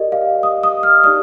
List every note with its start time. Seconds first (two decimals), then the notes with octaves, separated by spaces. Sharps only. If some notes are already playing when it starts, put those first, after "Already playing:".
Already playing: G4 A#4 D5 D#5
0.12 F5
0.43 D#6
0.63 D#6
0.83 F6
1.04 D#4 G4 D5 D#6